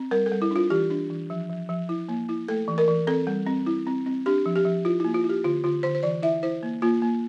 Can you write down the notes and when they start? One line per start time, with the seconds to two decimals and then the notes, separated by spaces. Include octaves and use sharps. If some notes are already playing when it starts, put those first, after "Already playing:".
Already playing: C4
0.11 G3 A#4
0.26 A4
0.31 G3
0.42 E4
0.51 D4 F4
0.70 E3 G4
0.90 D4
1.10 E3
1.30 F3
1.50 F3
1.69 F3
1.89 E4
2.09 A#3
2.29 E4
2.48 A3 A4
2.68 E3
2.78 A#4
2.88 E3
3.07 C4 A4
3.27 G3
3.46 C4
3.66 E4
3.87 C4
4.06 C4
4.26 D4 G4
4.46 F3
4.56 G4
4.65 F3
4.85 E4 F4
5.00 E4
5.05 A#3
5.14 F4
5.24 E4
5.29 G4
5.44 D3 F4
5.64 D3 F4
5.83 D3 C5
5.95 C5
6.03 E3 D5
6.23 E4 E5
6.43 E4 C5
6.63 A#3
6.82 A#3 F4
7.02 A#3